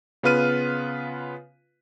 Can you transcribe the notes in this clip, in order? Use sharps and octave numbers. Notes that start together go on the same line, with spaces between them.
C#3 B3 F4 B4 F6 D#7